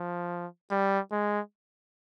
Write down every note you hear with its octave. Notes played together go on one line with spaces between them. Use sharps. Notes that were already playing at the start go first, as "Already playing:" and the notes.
Already playing: F3
G3
G#3